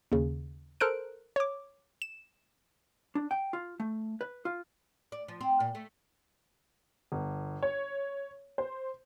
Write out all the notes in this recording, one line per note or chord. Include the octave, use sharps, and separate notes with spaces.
D#2 C#3
A4 A#4 C5 F#6 D7
C#5 D6
E7
D4
G5
F4
A3
B4
F4
D5
F3
C4
A#2
A3
G1
C#5
C5